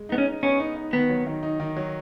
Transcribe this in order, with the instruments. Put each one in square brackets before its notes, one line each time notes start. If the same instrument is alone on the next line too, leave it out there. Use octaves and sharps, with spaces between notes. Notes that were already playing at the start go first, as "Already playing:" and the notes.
Already playing: [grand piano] G#3
[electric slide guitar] B3 [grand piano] D#4
[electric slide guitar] C#4
[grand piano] D#4
[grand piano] B3 [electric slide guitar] C#4
[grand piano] D#4
D#4
[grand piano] D#3 [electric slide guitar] B3
[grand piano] F#3
D#3
D#4
D#3
F#3